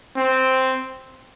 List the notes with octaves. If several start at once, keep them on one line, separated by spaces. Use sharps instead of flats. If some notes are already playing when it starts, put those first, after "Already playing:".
C4